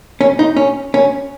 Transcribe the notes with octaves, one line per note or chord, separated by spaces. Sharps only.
C#4
D#4
C#4
C#4